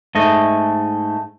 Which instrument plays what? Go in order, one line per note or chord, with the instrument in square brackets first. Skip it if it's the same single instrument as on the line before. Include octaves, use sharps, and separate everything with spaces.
[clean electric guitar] G#2 A3 D#5